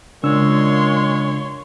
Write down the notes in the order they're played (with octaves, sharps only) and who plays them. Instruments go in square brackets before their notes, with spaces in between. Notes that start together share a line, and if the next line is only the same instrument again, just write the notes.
[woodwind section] A#2 G#3 [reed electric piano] C#3 D4 E6 [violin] C#5 C6